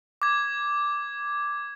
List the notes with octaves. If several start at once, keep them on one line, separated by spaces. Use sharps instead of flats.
D6 G#6